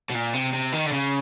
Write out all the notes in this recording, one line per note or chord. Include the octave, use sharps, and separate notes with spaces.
B2
A#2
C3
C3
D#3
D3
C#3